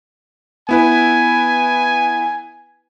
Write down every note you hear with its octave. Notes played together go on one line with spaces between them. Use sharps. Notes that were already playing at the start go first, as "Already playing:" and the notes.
B3 E4 B4 G#5